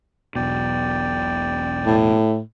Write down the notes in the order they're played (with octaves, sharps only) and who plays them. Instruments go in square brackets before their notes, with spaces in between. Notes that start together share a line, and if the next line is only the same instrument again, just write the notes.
[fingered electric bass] E1 B1 B2 [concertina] D5 G5
[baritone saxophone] A2